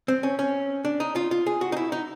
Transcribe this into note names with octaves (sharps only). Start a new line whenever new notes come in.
C4
C#4
C#4
D4
D#4
F4
F4
G#4
F#4
D#4
E4
D#4